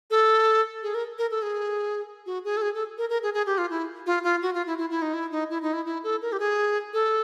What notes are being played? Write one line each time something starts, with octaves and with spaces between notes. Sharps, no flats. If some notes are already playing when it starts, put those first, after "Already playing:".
A4
G#4
A#4
A#4
A4
G#4
F#4
G#4
A4
G#4
A4
A#4
A#4
G#4
G#4
G4
F4
E4
F4
F4
F#4
F4
E4
E4
E4
D#4
E4
D#4
E4
D#4
E4
E4
A4
A#4
G4
G#4
A4